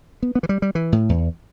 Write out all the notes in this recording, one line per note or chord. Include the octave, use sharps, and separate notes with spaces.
B3
B3
E3
G3
G3
E3
A2
E2